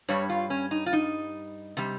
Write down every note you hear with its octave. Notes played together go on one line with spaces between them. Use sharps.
G2 G3 C#5
F4
C#4
D#4
F4
D#4
C3 G3